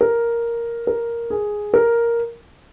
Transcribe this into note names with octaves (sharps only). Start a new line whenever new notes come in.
A#4
A#4
G#4
A#4